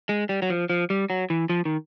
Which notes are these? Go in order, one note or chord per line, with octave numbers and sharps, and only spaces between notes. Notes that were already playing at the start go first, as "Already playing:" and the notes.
G#3
G3
F#3
F3
F3
G3
F#3
E3
F3
D#3